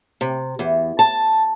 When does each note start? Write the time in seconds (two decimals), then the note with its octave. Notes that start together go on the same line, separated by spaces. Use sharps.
0.21 C3
0.59 E2
0.99 A5